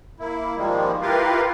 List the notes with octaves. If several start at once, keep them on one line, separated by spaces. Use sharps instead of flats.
A#3 E4
G#2 D#3 F3 G3 G#3 A#3
E4 F4 G4 A#4 B4 F5